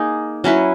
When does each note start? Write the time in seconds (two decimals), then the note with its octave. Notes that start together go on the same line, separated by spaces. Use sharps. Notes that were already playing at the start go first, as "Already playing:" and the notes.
Already playing: A#3 D#4 G#4
0.44 F#3 C#4 E4 B4